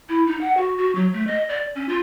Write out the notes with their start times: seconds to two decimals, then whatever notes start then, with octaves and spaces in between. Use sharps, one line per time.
0.09 E4
0.27 D#4
0.41 F#5
0.57 F#4
0.78 F#4
0.95 F#3
1.13 A3
1.27 D#5
1.49 D5
1.75 C#4
1.89 F4